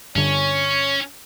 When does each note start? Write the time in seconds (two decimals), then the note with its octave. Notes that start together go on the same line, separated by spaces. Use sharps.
0.16 G2 D3 C#4 C#5